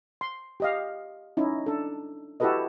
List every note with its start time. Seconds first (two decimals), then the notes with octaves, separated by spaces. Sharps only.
0.21 C6
0.60 G4 D#5 F5
1.37 C#4 D#4 E4
1.66 D4 A4
2.40 E4 F#4 G4 A4 B4 D#5